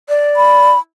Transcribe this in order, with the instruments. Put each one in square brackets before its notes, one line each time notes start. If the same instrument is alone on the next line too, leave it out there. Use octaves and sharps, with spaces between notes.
[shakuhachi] D5
[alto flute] B5